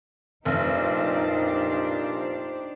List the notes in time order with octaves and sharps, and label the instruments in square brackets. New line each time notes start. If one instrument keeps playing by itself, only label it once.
[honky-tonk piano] F1 [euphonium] A#2 [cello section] D4 G4 C5 [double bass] D#4